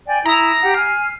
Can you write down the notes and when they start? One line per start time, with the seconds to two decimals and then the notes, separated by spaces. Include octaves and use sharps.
0.06 D5 G5 G#5
0.25 E4 A#5 D#6 E6
0.60 G4 F#5
0.74 G#5 F6 C7